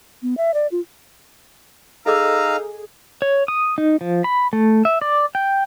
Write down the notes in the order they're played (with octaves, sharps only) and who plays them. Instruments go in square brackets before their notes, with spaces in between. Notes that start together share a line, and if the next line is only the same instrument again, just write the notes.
[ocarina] B3
E5
D5
F4
[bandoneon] D#4 F5 A#5 [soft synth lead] G#4 [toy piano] A4 D#5 D6 [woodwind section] E6
[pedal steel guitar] C#5
D#6
D#4
F3
B5
A3
E5
D5
G5